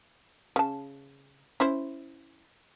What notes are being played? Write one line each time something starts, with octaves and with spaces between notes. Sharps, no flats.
C#3 A5
C#4 E4 C5